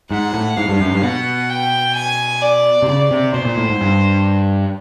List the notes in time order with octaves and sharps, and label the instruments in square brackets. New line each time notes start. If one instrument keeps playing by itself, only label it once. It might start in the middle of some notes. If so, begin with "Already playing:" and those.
[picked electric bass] G#2 [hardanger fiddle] F#5
[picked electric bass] A2
[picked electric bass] G#2 [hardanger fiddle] F5
[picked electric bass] G2
F#2
G2
[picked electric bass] B2 [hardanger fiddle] F#5
[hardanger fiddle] G5
G#5
D5
[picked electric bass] C3
[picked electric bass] C#3 [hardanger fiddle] D5
[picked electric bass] C3
[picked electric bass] B2 [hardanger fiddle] C5
[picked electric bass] A#2
A2
G#2
G2